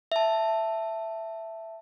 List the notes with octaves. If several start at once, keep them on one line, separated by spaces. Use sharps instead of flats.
E5 A5